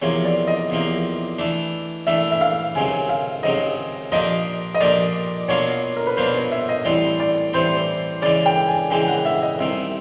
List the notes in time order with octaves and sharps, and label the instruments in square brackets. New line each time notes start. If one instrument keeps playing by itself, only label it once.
[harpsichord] E2 C3 F3 A#3 [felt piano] C#5
[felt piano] D5
D#5
[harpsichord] E2 C3 F3 A#3
E3 A3 D4
[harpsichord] E3 A3 D4 [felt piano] E5
[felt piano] E5
F5
[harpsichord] C#2 C3 D#3 F#3 [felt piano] G#5
[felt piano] F5
[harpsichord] C#2 C3 D#3 F#3 [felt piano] D#5
[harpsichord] A#2 F3 A#3 D4 G4 [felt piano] D#5
[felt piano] D#5
[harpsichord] A#2 F3 A#3 D4 G4 [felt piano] D5
[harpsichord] B2 F#3 A#3 D4 F4 [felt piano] C#5
[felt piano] A#4
B4
[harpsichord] B2 F#3 A#3 D4 F4 [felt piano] C5
[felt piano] C#5
E5
D#5
[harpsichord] A2 E3 G3 C4 [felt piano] D5
[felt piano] D5
[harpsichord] A2 E3 G3 C4 [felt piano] C5
[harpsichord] C#3 E3 G#3 [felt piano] D5
[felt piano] G5
G#5
[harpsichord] C#3 E3 G#3 [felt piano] G5
[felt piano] F#5
E5
D#5
[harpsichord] C2 C3 D#3 [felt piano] E5